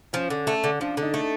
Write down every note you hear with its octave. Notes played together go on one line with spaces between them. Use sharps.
F3 C#4
D3
A3
D3
F3 D4
D3 D#4
A3